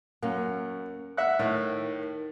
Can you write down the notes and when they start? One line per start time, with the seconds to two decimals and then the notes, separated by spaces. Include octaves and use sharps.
0.23 F#2 A#3 C#4
1.17 E5 F#5 F#6
1.39 A2 D#3